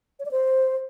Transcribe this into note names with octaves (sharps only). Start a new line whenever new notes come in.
C#5
D5
C5